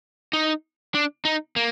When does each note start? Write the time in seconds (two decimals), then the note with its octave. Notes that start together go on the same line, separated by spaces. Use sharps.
0.33 D#4
0.95 D4
1.25 D#4
1.56 A#3